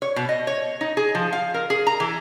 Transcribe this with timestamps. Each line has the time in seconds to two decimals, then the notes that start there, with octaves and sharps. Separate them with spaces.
0.02 C#5
0.16 B2
0.29 D#5
0.47 C#5
0.81 D#4
0.97 G#4
1.15 F3
1.33 F5
1.54 A#4
1.70 G#4
1.87 A#5
2.00 E3